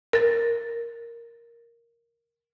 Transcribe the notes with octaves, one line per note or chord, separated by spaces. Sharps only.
A#4 A6